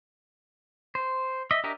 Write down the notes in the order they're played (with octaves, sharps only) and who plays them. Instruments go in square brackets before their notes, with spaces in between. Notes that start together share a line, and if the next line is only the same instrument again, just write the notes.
[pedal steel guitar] C5
D#5 E5
D4 G4 A#4 D#5 E5